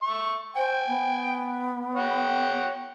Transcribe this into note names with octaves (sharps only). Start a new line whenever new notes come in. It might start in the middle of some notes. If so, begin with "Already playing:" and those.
E5 C#6
C5 G5 G#5
B3
C#5 F#5 G5